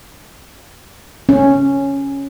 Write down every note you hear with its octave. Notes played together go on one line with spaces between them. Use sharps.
C#4